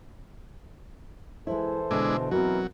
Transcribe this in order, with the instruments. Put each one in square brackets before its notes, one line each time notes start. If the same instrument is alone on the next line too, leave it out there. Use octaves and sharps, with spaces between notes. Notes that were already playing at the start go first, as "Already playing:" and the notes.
[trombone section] E3 A4 C5 [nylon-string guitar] G#3 E4
[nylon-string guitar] B2 D3 [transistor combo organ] G#3 D4 E4
[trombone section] B2 E3 A#4 [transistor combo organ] F#3 [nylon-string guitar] C4 F#4